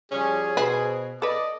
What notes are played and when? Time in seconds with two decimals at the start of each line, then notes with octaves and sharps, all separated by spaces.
0.12 F3 G3 C#4 G#4
0.57 B2 B4 C5 G#5
1.22 A4 B4 D5 D#5